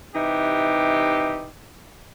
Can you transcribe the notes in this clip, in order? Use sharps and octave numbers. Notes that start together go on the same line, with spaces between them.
C3 E3 D#4 G4